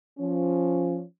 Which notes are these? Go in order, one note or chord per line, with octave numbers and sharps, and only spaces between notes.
F3 C#4